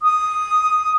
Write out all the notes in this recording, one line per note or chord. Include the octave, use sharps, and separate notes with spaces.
D#6